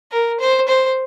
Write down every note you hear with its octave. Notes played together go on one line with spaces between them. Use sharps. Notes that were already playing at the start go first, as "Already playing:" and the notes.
A#4
C5
C5